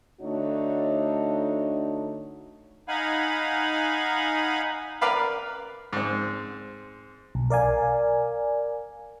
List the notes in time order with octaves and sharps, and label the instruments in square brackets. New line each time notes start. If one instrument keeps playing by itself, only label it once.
[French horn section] D3 A3 D4 D#4 F#4 C#5
[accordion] D#4 F5 F#5 G#5 B5
[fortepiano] A#4 B4 D5 F5 B5
G#2 C4
[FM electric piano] B1
A#4 D5 F5 G#5